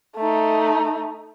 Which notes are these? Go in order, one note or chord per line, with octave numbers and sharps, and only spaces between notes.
A3 D#4